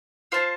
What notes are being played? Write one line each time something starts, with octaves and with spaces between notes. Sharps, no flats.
F4 C5 F5 A5